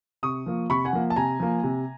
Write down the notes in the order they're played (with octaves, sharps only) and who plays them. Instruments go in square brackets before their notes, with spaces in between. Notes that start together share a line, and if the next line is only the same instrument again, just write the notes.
[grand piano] C3 C#6 D#6
F3 A#3
C3 B5 C#6
F#5 G#5
F3 A#3
A5
C3 G#5 A#5
F3 A#3
C3